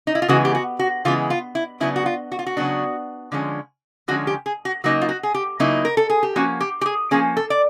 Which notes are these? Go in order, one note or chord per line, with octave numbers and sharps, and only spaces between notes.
D#4
E4
F4
C#3 E3 G#3 B3 F#4
G4
F#4
F#4
C#3 E3 G#3 B3 F4
F4
E4
C#3 F#3 B3 D4 E4
F#4
F4
F#4
F4
F#4
C#3 F#3 B3 D4
D3 F3 G#3 C#4
D3 F3 G#3 C#4 F#4
G4
G#4
F#4
C#3 F#3 A#3 D#4 F#4
F4
F#4
G#4
G4
C#3 F#3 A#3 D#4 E4
A#4
A4
G#4
G4
F3 A#3 C#4 F#4
G4
G4
G#4
F3 A#3 C#4 G#4
A4
D5